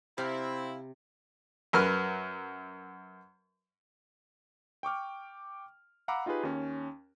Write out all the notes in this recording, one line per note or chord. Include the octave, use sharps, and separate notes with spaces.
C3 C4 E4 F5 B5 G6
F#2 A#4 B4 F6
G5 C#6 D6 F6
F5 F#5 A#5 B5 D6 E6
D#4 F4 G4 G#4 B4
D#2 C#4